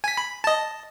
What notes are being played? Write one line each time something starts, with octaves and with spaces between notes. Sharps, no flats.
G#5 B6
B5
D#5 A5